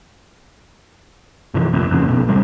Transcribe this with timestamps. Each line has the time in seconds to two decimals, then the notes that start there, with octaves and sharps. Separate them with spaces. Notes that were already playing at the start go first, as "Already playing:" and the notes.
1.54 G2 C3 E3 F3
1.73 F1 A#1 F2
1.91 F2 C#3
2.08 A#1 B2
2.29 C3 G3 G#3